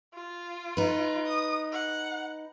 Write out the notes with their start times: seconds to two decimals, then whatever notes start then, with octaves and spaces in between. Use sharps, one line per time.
0.14 F4
0.77 D#4 B4
1.26 D#6
1.73 F#5